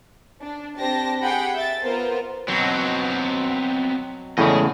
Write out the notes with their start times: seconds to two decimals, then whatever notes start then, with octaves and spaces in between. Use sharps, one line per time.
0.42 D4
0.79 C4 D4 G4 C5 A5 A#6
1.21 G4 G#4 F#5 G5 B5
1.55 E5 A6
1.83 B3 F4 A#4 C5
2.48 B2 F#3 B3 C4
4.38 E2 A2 C#3 G#3 D#5